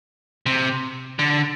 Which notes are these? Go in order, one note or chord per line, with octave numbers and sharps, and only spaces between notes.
C3
D3